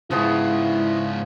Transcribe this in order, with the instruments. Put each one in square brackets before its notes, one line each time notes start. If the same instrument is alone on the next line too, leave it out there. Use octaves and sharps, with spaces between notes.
[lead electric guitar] G#2 C#3 [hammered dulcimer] F3 B3 G#4 [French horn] E4